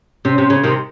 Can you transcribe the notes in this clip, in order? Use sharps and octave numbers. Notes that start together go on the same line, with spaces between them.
C3 C#4
C3
C#3
C3 D#3